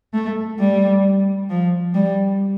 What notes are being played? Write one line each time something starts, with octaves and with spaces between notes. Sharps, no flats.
A3
G3
F3
G3